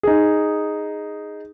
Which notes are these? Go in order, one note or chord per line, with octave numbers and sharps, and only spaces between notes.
D#4 G#4